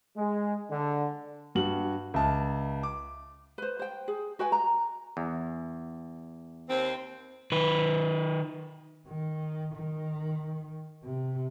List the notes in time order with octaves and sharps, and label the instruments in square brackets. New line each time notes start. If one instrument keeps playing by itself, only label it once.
[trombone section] G#3
D3
[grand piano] G2 F#4 F#7
C#2 E5 A5
D6
[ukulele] B4 C5
C5 G5
G#4
F#4 B4 G5 G#5
A#5
[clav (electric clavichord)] E2
[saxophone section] D#2 C4
[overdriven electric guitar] D#3 B4
[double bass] D#3
D#3
C3